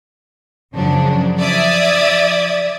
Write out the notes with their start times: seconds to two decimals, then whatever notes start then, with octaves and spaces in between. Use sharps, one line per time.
0.74 F#2 C#3 F3 F#3 D4
1.40 F3 D5 E5 D#6 G#6 A6